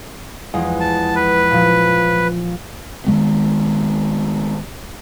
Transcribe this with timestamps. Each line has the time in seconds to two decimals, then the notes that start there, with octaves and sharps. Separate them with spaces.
0.53 E2 F3 G#3
0.80 A5
1.15 B4
1.50 A#2 F3
3.07 D#3 F3 G#3 B3